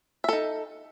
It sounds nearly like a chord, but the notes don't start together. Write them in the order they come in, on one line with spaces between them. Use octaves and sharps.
E5 A4 D#4